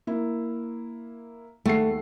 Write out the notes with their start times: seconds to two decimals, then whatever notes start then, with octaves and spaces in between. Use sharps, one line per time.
0.07 A#3 E4
1.66 D#2 A3 F#5 C7